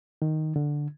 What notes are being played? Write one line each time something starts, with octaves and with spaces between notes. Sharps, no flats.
D#3
D3